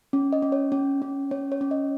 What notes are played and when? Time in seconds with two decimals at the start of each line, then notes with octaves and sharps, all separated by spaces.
0.13 C#4
0.33 D#5
0.42 C#4
0.52 C#5
0.72 C#4
1.02 C#4
1.31 C#4 C#5
1.52 C#5
1.61 C#4
1.71 D#5